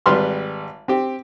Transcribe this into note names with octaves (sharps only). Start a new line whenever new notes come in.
G#1 G3 B4 C6 F6
C4 G4